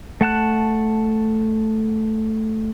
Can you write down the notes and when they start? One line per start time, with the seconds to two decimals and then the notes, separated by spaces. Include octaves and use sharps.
0.21 A3 F#5 A5 F#6